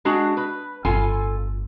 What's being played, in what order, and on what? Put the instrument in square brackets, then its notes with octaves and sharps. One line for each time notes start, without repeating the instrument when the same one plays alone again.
[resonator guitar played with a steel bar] G#3 D4 F#4
B4
[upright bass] G1 A2 [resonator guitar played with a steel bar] F4 A4 G#5